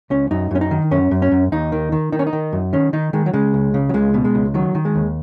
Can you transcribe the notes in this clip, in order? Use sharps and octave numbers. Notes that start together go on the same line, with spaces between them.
C#2 C#4
F#2 D#4
F#2 C#4
D#4
D#3
F#2 C#4
F#2
C#4
F#2
D#2 D#4
D#3
D#3
D#3 D#4
C#4
D#4
D#3
F#2
D#3 C#4
D#3 D#4
D#3 G#3
F#3
C#3 G#3
C#2
C#3
F#3
C#2 G#3
B2
G#3
C#2
D#3 F#3
D#3
G#3
D#2